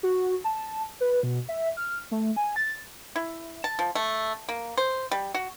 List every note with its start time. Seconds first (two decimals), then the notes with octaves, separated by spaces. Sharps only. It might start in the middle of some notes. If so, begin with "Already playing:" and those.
0.03 F#4
0.44 A5
1.01 B4
1.23 B2
1.49 E5
1.77 F6
2.11 A3
2.36 G#5
2.56 A6
3.16 E4
3.64 A5
3.79 F3
3.95 A3
4.49 A#3
4.78 C5
5.11 G3
5.34 F#4